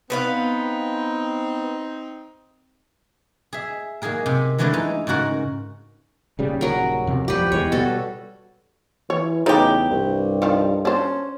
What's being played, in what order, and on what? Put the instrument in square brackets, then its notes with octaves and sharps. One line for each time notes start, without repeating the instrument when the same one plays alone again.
[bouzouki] B3 B4 F5 [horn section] C4 D#4
[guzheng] G#4 E5
F#3 A#3 D#4 G#4 A#4
C3
E3 F#3 G#3 A3 D4 E4
E3 D#4
G#2 C#3 F#4 A#4 F#5
[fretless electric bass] D#1 C#3 G3
[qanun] F#3 A#4
[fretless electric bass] F2 C3
[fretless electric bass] D#1 F3 G3 [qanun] G4 B4
[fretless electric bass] E2 E3 G#3 [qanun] C#5
[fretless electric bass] B2 G3 B3 [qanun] F#4 A4
[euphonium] E3 [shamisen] C#5
[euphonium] E2 [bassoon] C#3 [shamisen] F#3 A3 B4 [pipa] D#4 G4
[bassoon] C2 [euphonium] G2
[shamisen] D#3 F3
[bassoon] C#4 [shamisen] D4 C5